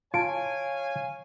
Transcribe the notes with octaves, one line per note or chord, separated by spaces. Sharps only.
F4 C#5 F5 G#5 A5 D7